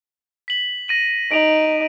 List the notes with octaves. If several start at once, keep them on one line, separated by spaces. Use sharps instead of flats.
B6 F#7
A#6 D#7 F#7
D#4 D7 F7 F#7